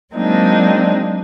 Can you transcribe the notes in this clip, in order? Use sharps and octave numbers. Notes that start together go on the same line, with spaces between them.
F#3 G#3 A#3 C4 D4 D#4